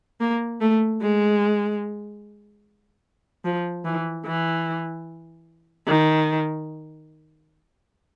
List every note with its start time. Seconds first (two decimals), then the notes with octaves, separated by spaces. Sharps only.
0.20 A#3
0.61 A3
1.02 G#3
3.45 F3
3.85 E3
4.26 E3
5.88 D#3